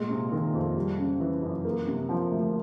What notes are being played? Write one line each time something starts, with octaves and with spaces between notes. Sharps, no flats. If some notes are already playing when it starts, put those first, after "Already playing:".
Already playing: A#2 G#3
C3
D#3
F2
G3
C#3
E3
F#2
A#3
C3
F3
D2